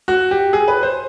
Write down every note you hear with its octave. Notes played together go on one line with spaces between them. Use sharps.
F#4
G4
G#4
B4
C5